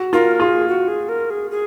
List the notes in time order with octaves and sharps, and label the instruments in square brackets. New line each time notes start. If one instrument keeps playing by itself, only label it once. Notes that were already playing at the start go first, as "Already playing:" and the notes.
Already playing: [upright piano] F#4
[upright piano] F4 [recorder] A#4
[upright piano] F4 [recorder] G#4
[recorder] F#4
G#4
A#4
G#4
G#4